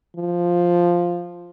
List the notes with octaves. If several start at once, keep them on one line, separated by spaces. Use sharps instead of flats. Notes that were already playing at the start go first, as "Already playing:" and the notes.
F3